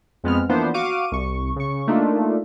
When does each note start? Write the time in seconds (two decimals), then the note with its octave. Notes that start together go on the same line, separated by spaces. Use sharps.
0.24 F2 G#3 B3 C4 F6
0.49 E3 F3 A#3 B3 D4 C5
0.74 F#4 F5 C#6 D6 D#7
1.12 C2 C#6
1.56 C#3 C#6
1.87 A3 A#3 D4 D#4 F4